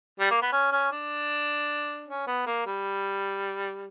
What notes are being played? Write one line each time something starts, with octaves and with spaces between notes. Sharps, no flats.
G3
A#3
B3
C#4
C#4
D4
C#4
B3
A#3
G3